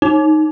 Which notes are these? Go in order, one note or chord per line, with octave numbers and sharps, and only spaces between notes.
D#4